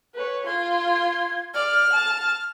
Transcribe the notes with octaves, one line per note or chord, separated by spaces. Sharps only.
B4 C#5
F4 C6 G#6
D5 F6
A5